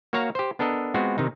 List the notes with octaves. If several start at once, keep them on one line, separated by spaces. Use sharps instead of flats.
A#3 F#4 C#5 F5 A#5
G4 C5
B3 D4 A4 A#4 D#5
G#3 B3 C4 F4 F#4
C3 D#3 D#4